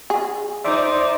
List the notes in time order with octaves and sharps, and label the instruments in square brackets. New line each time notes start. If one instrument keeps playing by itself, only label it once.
[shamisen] G#4
[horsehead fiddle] D#4 C5 [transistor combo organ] D5 [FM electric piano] E5 C6 D6